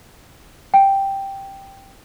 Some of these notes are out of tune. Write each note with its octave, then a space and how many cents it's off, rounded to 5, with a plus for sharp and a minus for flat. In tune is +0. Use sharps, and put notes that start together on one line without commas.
G5 +0